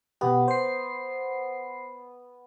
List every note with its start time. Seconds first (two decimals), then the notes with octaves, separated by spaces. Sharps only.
0.21 B2 B3 G4
0.48 C5 C7